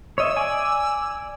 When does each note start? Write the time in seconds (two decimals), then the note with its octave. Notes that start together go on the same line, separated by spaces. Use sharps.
0.18 C#5 D#5 E5 E6
0.36 D5 G#5